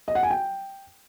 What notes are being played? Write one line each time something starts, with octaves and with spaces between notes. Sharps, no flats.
D#5
F#5
G#5
G5